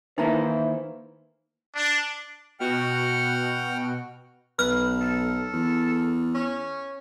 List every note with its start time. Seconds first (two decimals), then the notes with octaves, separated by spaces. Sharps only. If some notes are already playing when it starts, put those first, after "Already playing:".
0.18 D#3 E3 A#3 D#4 E4 C5 A#5
1.76 D4
2.60 B2 F#4 F#5 G5 F6
4.59 B1 B4 F6
5.01 A4
5.53 E2
6.35 C#4